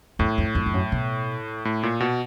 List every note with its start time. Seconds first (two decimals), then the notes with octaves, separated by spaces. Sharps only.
0.19 E2 A2
0.38 F2
0.55 F2
0.66 F2
0.74 F#2
0.92 B2
1.65 A2
1.83 A#2
2.00 B2